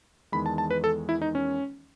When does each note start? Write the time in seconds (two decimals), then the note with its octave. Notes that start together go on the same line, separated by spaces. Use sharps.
0.32 E2 D#3 G#3 B5
0.46 A5
0.58 A5
0.71 B4
0.84 A4
1.09 E4
1.22 D#4
1.35 C#4